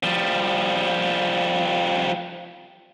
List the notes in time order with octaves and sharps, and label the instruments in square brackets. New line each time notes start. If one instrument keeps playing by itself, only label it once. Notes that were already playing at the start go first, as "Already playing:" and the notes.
[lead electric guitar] F3 G3